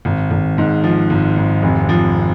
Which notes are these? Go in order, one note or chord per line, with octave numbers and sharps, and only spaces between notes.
G#1
G#1
G#2
F3
G#1
G#1
F1
F3